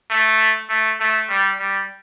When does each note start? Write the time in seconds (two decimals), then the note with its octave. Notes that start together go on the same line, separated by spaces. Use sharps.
0.10 A3
0.69 A3
1.00 A3
1.29 G3
1.59 G3